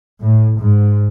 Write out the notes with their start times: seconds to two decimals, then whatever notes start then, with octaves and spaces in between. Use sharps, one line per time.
0.21 A2
0.60 G#2